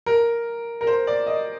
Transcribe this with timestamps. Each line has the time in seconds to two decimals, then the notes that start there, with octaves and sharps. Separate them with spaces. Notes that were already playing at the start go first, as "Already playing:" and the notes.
0.06 A#4
0.81 A#4
0.87 C5
1.07 D5
1.27 D#5